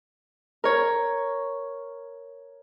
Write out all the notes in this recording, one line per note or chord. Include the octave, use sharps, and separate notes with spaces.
A#4 C#5